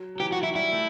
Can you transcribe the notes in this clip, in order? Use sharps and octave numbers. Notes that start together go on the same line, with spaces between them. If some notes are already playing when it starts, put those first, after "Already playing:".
Already playing: F#3
F#3
E3 G4
F#4
F#3
E4
G3 E4
A3